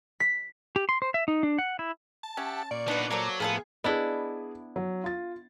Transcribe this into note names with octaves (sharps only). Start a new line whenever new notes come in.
B6
G4
C6
C5
E5
D#4
D4
F#5
E4
A5
C#4 G4 E5 F#5
A#2 D5 C#6
B3 D4 D#4 B4
F#3 A#3 A4 C5
A2 F3 A#3 B3 G#4 A4 F5
B3 D4 E4 G#4 D#5
F#3
F4 A6